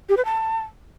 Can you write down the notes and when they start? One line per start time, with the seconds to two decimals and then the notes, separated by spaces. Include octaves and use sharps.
0.09 G4
0.17 B4
0.25 A5